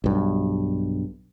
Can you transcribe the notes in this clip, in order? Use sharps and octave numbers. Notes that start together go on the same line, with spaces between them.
B1 G2